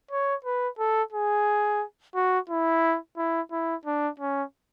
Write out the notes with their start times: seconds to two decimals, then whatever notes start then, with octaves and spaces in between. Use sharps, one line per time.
0.11 C#5
0.44 B4
0.79 A4
1.12 G#4
2.15 F#4
2.49 E4
3.17 E4
3.51 E4
3.85 D4
4.19 C#4